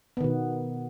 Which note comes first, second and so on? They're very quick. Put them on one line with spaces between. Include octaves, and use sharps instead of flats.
B3 D#3 B2